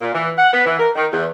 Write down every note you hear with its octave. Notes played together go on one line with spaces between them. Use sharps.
A#2
E3
F#5
B3
E3
A#4
D#3
E2